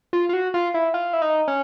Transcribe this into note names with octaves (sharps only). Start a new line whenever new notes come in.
F4
F4
F#4
F4
E4
F4
E4
D#4
C#4